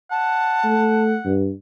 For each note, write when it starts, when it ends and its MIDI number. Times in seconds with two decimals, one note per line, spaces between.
0.11 1.41 78
0.11 1.03 81
0.64 1.17 57
1.25 1.51 43